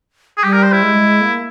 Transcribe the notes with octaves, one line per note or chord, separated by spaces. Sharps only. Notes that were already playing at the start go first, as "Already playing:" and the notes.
G#4
G3 G4
A#4
C5
E4
G#3
A#3